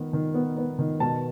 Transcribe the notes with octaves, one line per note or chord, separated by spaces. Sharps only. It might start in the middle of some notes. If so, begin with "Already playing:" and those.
Already playing: D#3 B3
D#3
B3
B3
D#3
B2 A5